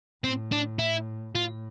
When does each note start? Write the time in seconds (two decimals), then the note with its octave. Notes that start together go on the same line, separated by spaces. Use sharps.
0.24 A2 C4
0.52 D4
0.79 E4
1.35 A2 F4